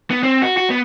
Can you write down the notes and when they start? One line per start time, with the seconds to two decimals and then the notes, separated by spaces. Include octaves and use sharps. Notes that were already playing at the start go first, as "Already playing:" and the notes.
0.11 B3
0.23 C4
0.42 F#4
0.57 F#4
0.70 B3